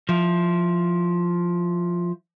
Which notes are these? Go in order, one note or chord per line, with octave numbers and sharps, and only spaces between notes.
F3 E4